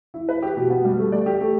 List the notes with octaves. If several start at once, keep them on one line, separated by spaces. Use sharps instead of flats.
E4
B4
G4
B2
B3
G3
A3
D5
G4
A3